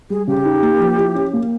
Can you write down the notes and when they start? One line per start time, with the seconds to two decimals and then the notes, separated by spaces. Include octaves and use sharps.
0.10 G3 G#4
0.27 C#3 G4
0.45 D#4
0.62 A#3
0.80 F3
0.98 E4
1.15 C#4
1.33 A#3